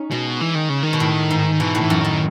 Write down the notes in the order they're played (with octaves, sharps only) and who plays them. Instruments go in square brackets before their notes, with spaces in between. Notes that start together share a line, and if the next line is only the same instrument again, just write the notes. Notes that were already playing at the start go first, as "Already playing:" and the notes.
Already playing: [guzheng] C#4 D#4
[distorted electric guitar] B2 [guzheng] G#3
[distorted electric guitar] E3
D#3
C#3
D#3
[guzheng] B2
A2
G#2
[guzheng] B2 [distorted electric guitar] E3
[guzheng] A2
[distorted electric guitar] E3
[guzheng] F#2
[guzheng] F#2 [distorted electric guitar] D#3